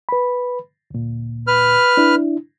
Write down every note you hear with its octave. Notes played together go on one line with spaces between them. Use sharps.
B4 B5
D2 A#2
B4 F6
D4 E4